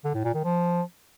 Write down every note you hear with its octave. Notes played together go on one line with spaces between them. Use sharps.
D3
A2
A#2
D#3
F3